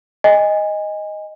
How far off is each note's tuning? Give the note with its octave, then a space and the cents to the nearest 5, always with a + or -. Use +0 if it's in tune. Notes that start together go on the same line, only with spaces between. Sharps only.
D#5 +0 G#5 -25